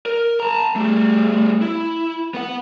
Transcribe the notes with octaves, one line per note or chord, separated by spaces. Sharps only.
A#4
A5 A#5
G3 A3
E4
B3 F#5